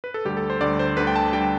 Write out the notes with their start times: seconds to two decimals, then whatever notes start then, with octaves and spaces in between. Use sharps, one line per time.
0.04 B4
0.14 A4
0.25 D2 D3 G3 G4
0.37 A4
0.50 C5
0.60 D2 D3 G3 D5
0.79 C5
0.97 D2 D3 G3 B4
1.07 G5
1.16 A5
1.32 D3 G3 G5